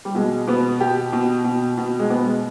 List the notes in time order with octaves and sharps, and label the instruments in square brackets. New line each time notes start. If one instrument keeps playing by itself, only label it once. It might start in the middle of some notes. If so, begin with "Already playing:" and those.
[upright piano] G3
B2 G#3
B2 B3
B2 G4
B2
B2
B2
G#3
B2 B3
G#3